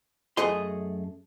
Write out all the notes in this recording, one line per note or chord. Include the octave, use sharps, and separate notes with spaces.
F#2 A3 G#4 D#5 C6